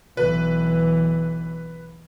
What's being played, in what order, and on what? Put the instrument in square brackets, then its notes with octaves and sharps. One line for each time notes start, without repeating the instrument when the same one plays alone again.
[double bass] B1 E3 [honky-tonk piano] B4